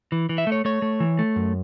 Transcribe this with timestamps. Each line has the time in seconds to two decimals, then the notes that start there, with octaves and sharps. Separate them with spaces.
0.12 E3
0.29 E3
0.38 E5
0.47 A3
0.52 C#5
0.65 A3 C#5
0.82 A3
1.00 E3
1.19 A3
1.36 F#2